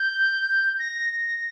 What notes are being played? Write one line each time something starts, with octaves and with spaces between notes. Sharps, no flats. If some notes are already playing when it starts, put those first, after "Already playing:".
Already playing: G6
A#6